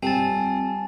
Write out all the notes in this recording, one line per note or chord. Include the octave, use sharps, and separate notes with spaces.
F2 G3 C4 G#5 A5 A6